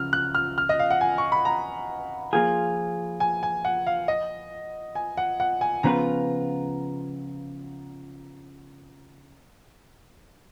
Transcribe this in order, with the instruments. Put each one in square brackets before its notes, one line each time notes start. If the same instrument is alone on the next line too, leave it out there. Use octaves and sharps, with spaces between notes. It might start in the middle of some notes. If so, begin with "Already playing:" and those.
Already playing: [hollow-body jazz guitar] C#3 F3 [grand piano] F6
[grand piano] F#6
F6
F6
D#5
F5
F#5
G#5
C#6
B5
A#5
[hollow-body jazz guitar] F3 A#3 F4 G#4
[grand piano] G#5
G#5
F#5
F5
D#5
G#5
F#5
F#5
G#5
[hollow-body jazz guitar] C#3 F3 B3 F4 B4 [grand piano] A#5